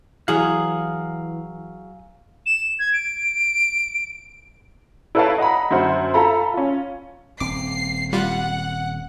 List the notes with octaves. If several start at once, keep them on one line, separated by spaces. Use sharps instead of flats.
E3 F#3 E4 G#4 F5 D#6 F#7
E7
G#6
D7
E4 A4 B4 C#5 F5 A5
D#5 F#5 A#5 B5
F#2 D3 C5 F#5
F4 A4 E5 A#5 B5
C#4 F4
D#1 C4 D6 C7
G3 F4 F#5